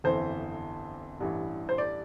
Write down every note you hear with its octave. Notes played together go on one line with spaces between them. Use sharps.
G1 F2 E3 C5
A1 G2 E3 G3
C5
D5